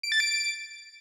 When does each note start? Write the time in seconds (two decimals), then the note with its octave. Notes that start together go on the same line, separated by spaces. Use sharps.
0.03 D7
0.12 A6
0.20 D7